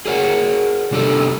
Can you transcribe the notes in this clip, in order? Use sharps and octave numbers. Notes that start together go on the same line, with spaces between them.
G#4 A#4 C#5 F#5
C3 G3 D4 G4 A4